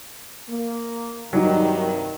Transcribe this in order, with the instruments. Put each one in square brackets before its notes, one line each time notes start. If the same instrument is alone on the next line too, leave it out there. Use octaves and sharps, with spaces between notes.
[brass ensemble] A#3
[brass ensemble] G2 C3 D#3 [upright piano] F#3 G3 D#4